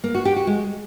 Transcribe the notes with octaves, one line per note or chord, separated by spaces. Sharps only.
A#3
F#4
G4
F#4
G#3